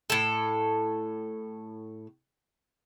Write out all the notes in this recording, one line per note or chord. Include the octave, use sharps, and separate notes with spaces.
A2 A4